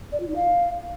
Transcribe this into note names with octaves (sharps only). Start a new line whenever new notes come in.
D5
F4
D#4
F5